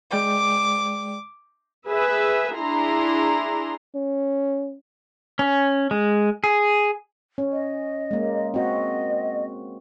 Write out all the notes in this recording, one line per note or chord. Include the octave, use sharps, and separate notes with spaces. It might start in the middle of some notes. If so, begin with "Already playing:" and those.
G#3 D5 G5 D6
G#4 B4 E5
D4 E4 G#4 A#5 C6
C#4
C#4
G#3
G#4
C#4
D#5
G#3 A#3
C4 F#4 D#5